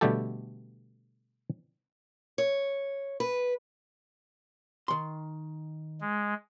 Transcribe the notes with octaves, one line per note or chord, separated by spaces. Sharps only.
B2 D3 G3 A3 G4 A4
C#5
B4
D#3 C6
G#3